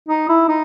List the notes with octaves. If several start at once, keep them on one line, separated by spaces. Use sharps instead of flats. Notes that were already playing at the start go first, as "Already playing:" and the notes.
D#4
E4
D#4